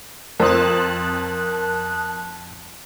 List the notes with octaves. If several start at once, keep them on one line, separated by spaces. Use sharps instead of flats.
F2 C4 A#4 A5 D#6 F#6